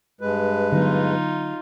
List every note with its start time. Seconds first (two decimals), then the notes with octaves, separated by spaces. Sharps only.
0.21 G2 G#3 B4
0.72 D3 F#3 B3 D#4 F4